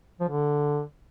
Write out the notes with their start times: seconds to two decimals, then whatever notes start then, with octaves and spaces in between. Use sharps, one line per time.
0.20 F3
0.28 D3